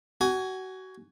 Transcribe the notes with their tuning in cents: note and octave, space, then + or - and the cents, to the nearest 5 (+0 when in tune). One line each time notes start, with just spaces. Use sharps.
F#4 +25 G#5 +0